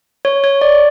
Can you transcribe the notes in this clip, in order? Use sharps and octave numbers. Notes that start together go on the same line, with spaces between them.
C#5
C#5
D5